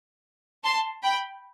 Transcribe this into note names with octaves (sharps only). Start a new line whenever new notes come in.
A5 C6
G5 B5